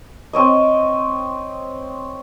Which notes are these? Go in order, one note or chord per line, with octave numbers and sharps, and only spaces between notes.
C4 C#5 D#5